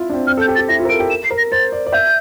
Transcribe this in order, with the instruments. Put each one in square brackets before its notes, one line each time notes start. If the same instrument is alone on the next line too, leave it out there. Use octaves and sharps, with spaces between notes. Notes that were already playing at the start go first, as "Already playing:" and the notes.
Already playing: [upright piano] E4 F4
D4
C4
[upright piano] C4 [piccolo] F6
[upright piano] A4 [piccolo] G6
[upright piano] G4
[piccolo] A6
[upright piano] G4
[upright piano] E4 [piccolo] A#6
[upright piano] F4
A#4
[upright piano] A4 [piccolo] D7
[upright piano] G4
[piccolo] E7
C7
[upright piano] A#4
[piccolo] A#6
[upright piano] C5 [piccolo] A6
[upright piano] D5
D5
[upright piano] E5 [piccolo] G6